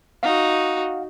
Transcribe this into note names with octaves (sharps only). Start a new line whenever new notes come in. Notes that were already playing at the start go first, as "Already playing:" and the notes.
D#4 F#4 F5 F#5